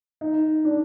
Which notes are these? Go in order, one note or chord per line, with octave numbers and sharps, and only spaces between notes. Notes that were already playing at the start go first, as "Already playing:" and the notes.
D#4
D4